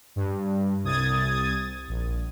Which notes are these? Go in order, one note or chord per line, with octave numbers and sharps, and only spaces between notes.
G2
C2 D#6 G#6 A6
A#1